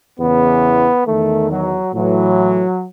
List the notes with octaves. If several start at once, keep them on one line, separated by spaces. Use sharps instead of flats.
E2 C#3 E3 B3
D#3 A3
E2
F#3
A2 E3 F#3